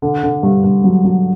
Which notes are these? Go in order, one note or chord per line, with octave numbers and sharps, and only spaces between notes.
D3
D3
G2
G2
F#3
F#3